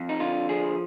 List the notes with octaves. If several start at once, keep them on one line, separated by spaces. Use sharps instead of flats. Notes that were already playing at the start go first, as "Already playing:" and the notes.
Already playing: F2
D#4
D3 F4
F3 G#4